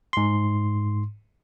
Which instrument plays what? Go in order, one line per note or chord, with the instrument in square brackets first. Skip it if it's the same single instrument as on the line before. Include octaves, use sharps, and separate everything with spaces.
[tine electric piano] G#2 C6